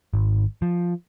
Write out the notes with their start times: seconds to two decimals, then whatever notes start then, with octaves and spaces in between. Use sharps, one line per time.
0.14 G#1
0.62 F3